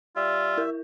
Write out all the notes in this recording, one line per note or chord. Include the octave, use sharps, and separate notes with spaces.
G3 F4 E5
E4 A#4